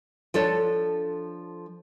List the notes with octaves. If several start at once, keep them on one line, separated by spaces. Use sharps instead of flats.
F3 D4 A4 C#5